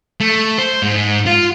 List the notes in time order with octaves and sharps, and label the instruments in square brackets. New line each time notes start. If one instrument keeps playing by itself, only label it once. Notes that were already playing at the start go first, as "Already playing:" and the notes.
[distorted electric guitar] A3
C5
G#2
F4